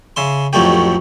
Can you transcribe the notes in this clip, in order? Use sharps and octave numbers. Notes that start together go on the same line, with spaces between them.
C#3 E5 C6
A1 F2 F#3 A3 G4